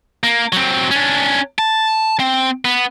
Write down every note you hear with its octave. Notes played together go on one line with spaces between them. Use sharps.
A#3
F#3 C4
C#4 D4
A5
C4
B3